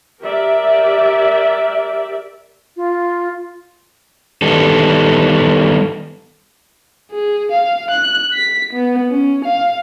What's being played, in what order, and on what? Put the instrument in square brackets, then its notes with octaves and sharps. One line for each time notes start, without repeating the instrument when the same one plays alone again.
[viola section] G4 A#4 D5 E5
[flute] F4
[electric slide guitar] D#3 G3 B3 A4
[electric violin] G#4
F5
F#6
B6
B3
C#4
F5